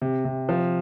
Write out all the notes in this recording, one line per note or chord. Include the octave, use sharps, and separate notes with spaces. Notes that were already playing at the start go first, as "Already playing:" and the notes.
C3
C3
F3